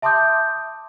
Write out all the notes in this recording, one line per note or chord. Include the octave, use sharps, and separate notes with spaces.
E5 A5 C6 D6 D#6 G6